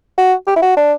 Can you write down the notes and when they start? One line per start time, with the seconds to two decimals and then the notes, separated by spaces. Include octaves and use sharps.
0.18 F#4
0.47 G4
0.56 E4
0.62 F#4
0.77 D4